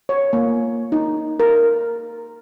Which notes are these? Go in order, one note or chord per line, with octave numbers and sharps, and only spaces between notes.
C#5
A#3
D#4
A#4